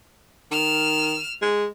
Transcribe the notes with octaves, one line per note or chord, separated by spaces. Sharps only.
D#3 F6 E7
G#3